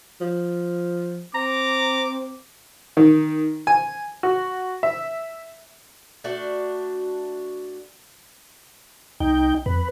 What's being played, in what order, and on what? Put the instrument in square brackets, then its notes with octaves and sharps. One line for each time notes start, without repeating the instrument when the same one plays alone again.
[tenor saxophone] F3
[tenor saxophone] C4 [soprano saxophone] A#5 [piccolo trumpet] D6
[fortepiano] D#3
G#5
F#4
E5
[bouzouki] A3 D4 F#4
[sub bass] C2 [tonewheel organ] D#4 G5
[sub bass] F2 [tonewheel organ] B4